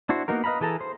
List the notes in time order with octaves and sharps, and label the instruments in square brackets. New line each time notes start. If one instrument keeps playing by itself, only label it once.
[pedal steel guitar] D4 E4 F#4 C5
A#3 B3 D#4 F#4 A#4
B4 D#5 F5 A#5 B5
E3 G#4 A4 A5 A#5
C5